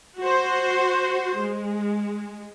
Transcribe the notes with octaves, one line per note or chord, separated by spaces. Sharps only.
F#4 C5
G#3